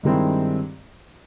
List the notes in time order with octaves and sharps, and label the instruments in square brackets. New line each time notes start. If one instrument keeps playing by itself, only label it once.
[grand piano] G2 D#3 G#3 C4 E4